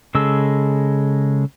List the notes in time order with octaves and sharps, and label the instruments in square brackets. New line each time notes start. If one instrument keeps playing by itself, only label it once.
[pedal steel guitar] C#3 G#3 A4 E6